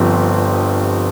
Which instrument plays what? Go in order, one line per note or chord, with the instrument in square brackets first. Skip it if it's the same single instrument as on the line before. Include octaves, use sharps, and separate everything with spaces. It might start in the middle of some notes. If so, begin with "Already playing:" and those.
Already playing: [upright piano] G1 G2 F3 C4